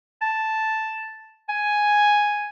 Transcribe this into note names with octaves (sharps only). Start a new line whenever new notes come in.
A5
G#5